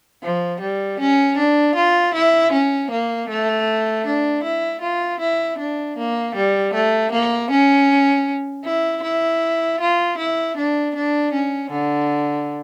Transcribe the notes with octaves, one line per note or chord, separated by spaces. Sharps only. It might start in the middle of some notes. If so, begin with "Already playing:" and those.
F3
G3
C#4
D4
F4
E4
C#4
A#3
A3
D4
E4
F4
E4
D4
A#3
G3
A3
A#3
C#4
E4
E4
F4
E4
D4
D4
C#4
D3